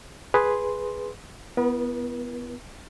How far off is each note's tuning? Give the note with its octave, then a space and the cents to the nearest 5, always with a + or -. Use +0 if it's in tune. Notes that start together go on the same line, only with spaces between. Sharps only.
G#4 +0 B4 +0 C6 +0
B3 +0 E4 +30 B4 -45